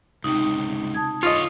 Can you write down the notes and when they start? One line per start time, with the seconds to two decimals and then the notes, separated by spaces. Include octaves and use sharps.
0.24 C#2 C3 D#4
0.94 A5 D#6 G#6
1.23 D3 F4 C#5 D#5